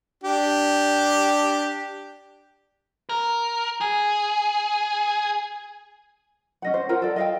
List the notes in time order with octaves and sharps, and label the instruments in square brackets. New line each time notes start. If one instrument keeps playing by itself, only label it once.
[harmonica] D4 G4
[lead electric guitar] A#4
G#4
[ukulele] C#4 D#5 F#5
C5
F4 A#4 F#5
A4 D5
D#5 F5 G5